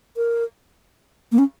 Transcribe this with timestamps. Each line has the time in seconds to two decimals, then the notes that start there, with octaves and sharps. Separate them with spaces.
0.17 A#4
1.32 A#3
1.38 C#4